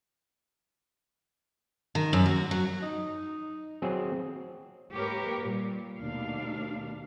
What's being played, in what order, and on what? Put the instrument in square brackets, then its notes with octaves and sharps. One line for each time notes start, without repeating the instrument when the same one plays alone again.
[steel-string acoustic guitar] D#3
F#2
F#4
F#3
[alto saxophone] D#4
[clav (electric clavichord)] F#3 C4 G#4
[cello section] G#2 A#3 G4 A#4 B4 C#5
A#2 G3
D#2 B2 A3 D4 F5